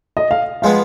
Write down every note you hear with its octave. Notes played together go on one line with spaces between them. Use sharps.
D#5
F5
F3 G#3 B3 F5